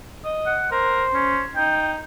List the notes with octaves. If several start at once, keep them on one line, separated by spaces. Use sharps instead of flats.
D#5
F#5
A#4 C5
C#4
D#4 G5